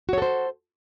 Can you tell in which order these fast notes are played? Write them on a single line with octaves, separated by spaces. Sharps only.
F#4 C#5 A4 C5